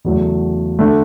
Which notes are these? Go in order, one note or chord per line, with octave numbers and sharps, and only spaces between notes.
E2 C#3 F#3 A3
D3 A3